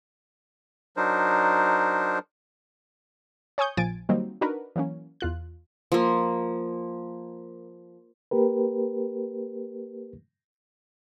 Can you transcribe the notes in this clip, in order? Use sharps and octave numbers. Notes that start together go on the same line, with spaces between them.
F#3 D4 D#4 A#4 C5
C#5 G#5 C#6 D#6 G6
A#1 F3 G#5 A6 D7
D#3 F#3 G3 A#3 C4 D#4
D4 D#4 F#4 A#4 B4
E3 F#3 A#3 C#4
E2 F4 F#6
F3 A#3
A#3 G4 A#4 B4